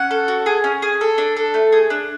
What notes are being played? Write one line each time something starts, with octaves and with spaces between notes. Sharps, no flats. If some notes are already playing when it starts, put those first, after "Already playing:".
Already playing: C#4 F#5
A4
F#4
G#4
C#4
G#4
A4
D4
A4
A3
G#4
D4